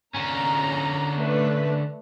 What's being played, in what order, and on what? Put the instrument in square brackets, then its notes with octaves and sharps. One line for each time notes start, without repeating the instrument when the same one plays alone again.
[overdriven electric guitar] D3 C#4 [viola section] A#5
[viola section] A3 D4 B4